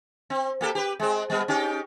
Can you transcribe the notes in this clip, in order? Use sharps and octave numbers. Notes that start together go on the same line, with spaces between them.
C4
A#3 G4 A4
G4 B4
G#3 C4
G3 B3
C#4 D#4 G4